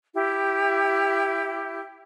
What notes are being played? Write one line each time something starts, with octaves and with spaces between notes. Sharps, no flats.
E4 G4